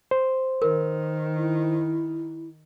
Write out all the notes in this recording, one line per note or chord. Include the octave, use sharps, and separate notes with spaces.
C5
D#3 A#4
E4